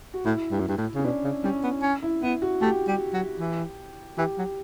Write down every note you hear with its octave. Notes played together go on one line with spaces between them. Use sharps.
F#4
A2 E4
G2
F#2
G2
A2
C#3 C#4
B2 D4
C#3
G3 C#4
B3
C#4
E4
B3 E4
F#4
A3 G4
G3
F#3
E3
E3 G4
F#3